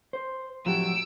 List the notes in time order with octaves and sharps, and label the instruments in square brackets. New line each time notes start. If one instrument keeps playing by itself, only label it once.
[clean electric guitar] C5
[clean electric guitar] A2 F#3 [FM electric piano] F3 G4 [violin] E6 D7